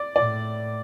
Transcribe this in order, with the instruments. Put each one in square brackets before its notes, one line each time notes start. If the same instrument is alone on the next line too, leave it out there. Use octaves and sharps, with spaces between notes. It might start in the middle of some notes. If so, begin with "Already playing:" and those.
Already playing: [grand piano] D5
[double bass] A2 [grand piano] D5